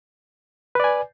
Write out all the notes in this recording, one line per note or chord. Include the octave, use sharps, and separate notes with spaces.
B4 D5 G#5